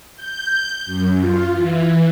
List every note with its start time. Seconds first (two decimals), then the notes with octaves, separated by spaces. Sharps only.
0.16 G6
0.85 F#2
1.20 F4
1.52 E3